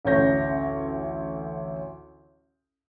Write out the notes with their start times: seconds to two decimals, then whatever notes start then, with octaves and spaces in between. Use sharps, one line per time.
0.05 A1 D2 C#4 C#5 G6 A#6